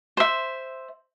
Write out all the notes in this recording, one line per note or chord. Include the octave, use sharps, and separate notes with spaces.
C5 E5